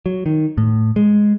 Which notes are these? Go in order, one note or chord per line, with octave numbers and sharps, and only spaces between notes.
F#3
D#3
A2
G#3